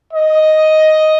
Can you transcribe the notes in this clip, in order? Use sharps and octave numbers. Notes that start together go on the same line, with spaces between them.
D#5